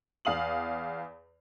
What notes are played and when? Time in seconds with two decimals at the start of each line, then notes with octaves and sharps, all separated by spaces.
0.25 E2 F5 D#6 F#7